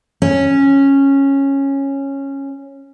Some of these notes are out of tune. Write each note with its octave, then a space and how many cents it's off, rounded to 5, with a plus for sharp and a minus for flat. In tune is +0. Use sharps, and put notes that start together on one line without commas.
C#4 -10